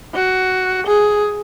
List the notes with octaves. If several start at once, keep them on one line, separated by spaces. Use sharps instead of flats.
F#4
G#4